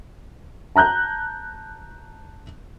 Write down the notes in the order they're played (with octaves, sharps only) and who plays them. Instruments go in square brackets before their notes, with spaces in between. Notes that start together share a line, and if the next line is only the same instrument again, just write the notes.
[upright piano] A5 A#5 F#6 G6